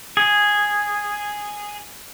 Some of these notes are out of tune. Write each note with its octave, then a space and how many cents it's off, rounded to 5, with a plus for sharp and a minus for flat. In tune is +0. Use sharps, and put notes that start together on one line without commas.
G#4 -5